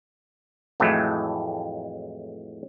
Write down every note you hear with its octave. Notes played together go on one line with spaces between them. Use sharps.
F2 A2 E3 F#3 G#3 A3